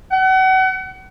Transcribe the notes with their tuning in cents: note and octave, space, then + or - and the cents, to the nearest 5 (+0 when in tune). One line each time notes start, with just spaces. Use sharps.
F#5 +35